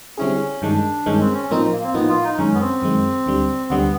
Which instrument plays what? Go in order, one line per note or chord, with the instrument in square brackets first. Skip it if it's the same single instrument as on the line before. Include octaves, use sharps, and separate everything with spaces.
[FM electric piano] D3 G3 C4 E4 G#4 [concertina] C#4
[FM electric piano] G2 D#3 G#3 [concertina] D4
[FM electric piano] G2 D#3 G#3 [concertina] C#4
[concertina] C4
C#4
[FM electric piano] A2 F3 A#3 D#4 [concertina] C4
[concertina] A#3
C4
[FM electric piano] A2 F3 A#3 D#4 [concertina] B3
[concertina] F4
D#4
[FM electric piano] F#2 D#3 G#3 [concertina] C#4
[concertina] B3
C4
[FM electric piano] F#2 D#3 G#3
D2 D3 G3
[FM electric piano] D2 D3 G3 [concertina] B3